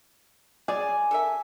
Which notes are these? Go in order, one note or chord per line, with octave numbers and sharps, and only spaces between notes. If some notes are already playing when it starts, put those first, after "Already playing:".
G#4 C#5 D5 G#5
A4 A#4 E5